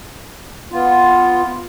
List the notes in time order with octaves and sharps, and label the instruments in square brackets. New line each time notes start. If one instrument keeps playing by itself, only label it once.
[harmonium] B3 F4